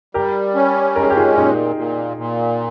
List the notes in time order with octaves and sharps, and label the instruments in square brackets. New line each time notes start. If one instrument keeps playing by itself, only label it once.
[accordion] G3 [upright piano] G4 A#4
[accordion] C#4
[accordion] G#3 [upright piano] A#4
[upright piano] G#4
G4
F4 G#4
[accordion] A#2 [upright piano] D#4 G4
[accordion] A#2
A#2